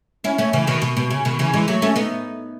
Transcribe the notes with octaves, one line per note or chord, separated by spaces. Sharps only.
C#4 E4
A3 C#4
C#3 E3
B2 D#3
B2
B2
C#3
B2 D#3
C#3 E3
E3 G#3
F#3 A3
A3 C#4
B3 D#4